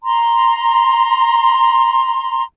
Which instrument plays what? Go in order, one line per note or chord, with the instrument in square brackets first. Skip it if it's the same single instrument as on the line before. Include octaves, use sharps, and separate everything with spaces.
[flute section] A#5 C6